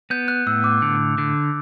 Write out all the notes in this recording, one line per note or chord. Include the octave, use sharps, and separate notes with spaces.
B3 G6
F#6
A2 E6
D6
D3
D3